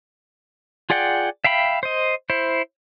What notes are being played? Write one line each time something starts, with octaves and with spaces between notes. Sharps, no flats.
F4 G#4 D5 F#5 G5
E5 F5 G5 B5
C5 D#5
E4 C5